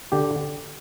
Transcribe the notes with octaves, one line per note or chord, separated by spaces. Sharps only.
D3 G4